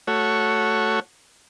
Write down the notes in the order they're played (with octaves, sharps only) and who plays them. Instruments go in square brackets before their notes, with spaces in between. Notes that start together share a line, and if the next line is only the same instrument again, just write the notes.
[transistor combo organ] A3 F#4 C#5